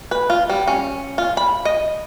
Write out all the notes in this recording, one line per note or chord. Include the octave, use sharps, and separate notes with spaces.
B4
F4
G3
C#4
F4
B5
D#5